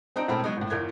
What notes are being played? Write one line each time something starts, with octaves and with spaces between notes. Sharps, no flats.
C4 D4 D#4 A#5 G6 D7
E1 A2 A3 C4 B5 F6
F#3 G#3 B3 D#4
G#1 A2
G1 E2 A#4 G6 G#6